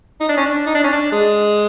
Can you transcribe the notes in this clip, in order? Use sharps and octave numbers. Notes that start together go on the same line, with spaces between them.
D#4
D4
C#4
D4
D#4
D4
C#4
D4
G#3